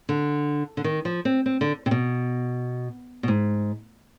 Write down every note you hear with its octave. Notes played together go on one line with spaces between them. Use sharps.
D3
D3
D#3
F3
C4
C4
D3
C3
B2
B2
G#2